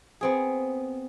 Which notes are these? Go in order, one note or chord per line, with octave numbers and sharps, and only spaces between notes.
B3 C4 G#4